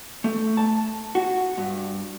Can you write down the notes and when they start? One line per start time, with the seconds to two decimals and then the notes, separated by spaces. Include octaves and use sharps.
0.24 A3
0.57 A5
1.15 F#4
1.57 G2